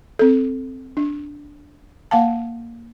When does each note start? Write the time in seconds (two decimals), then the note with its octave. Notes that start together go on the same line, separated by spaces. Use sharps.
0.19 C4 A4
0.97 D4
2.11 A#3 F5 F#5 A5